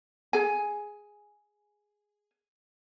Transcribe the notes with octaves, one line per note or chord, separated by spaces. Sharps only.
G#4 G#5